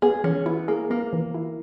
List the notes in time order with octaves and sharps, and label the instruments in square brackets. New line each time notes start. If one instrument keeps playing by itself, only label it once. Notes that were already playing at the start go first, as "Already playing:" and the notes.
[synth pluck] B3 [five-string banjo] G#4
[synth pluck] E3 [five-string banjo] C#4
[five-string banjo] B3 [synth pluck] E4
[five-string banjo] A#3 [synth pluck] G#4
[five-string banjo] A#3 [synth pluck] B3
[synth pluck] E3
E4